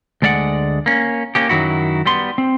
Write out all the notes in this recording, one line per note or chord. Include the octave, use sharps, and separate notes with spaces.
D2 G#3 D5 E5 F#5
A#3 C#4
A#3 C#4 G4
F#2 D#3 F#3 E4 F#4
G3 B3 C6
C4